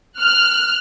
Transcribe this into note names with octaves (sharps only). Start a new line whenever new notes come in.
F6 F#6